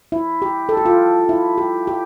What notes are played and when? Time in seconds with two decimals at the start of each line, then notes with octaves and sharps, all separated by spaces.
0.12 E4
0.42 G4
0.69 A4
0.77 G4
0.85 F4
1.29 E4
1.58 G4
1.87 G4